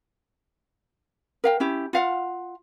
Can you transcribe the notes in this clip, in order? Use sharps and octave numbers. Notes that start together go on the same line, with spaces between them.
A#4 F5 G5
C#4 E4 G4
F4 F5 F#5